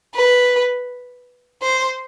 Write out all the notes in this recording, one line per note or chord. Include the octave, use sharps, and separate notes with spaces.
B4
C5